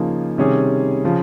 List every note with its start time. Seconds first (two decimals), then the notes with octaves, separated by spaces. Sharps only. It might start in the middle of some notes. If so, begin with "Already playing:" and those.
Already playing: C#3 F3 A#3 D#4 G#4
0.38 C3 D#3 G3 C#4 G#4
1.05 C#3 F3